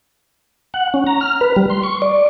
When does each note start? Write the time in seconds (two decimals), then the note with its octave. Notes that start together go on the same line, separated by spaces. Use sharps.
0.74 F#5
0.94 C#4
1.07 A#5
1.21 F6
1.41 B4
1.56 G3
1.70 C6
1.83 C#6
2.02 D5